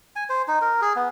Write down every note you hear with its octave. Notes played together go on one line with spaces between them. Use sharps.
G#5
C5
D#4
A#4
G#4
B3